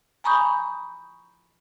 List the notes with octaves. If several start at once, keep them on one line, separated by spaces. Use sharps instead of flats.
G#5 A#5 B5 C#6 D#6 G6